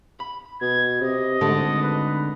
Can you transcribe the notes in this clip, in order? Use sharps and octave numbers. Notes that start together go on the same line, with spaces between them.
B5
B2 G#6
C3 D#5
G#1 D3 G#3 A3
B4